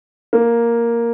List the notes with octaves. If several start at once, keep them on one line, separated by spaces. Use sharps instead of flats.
A#3